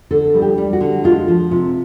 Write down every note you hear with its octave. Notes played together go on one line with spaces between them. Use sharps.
D3 A4
G3
G4
G3
F#4
D3
G#3 F4
F3
C3